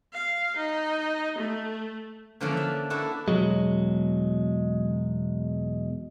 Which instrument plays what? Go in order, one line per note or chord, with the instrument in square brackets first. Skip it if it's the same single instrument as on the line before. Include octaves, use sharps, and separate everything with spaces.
[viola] F5
D#4
A3
[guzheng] D3 E3 F3 A#3 C#4 D4
D4 E5
A#3 D4 E4 F#4 A4
[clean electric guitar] E2 B2 F#3 G#3